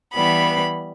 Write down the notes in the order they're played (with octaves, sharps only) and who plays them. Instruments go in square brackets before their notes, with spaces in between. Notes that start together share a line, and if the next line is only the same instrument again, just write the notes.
[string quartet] E3 G3 B3 [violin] B5